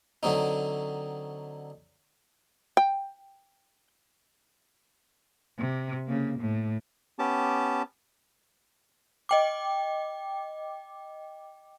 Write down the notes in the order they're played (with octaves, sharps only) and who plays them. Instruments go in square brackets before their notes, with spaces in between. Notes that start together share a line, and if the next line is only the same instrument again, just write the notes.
[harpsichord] D3 F#3 C4 D#4
[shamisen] G5
[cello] C3
C#3 A#3
A2
[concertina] B3 C#4 G4 A5 D6
[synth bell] D#5 G5 D6